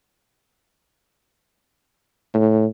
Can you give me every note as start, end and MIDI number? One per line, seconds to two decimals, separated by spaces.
2.34 2.66 45